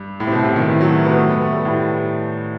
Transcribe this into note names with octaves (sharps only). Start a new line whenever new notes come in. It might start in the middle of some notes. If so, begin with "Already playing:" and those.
Already playing: G2
A2
C3
B2
C3
D#3
E3
F#3
A3
B3
A3
B3
A3
G3
A2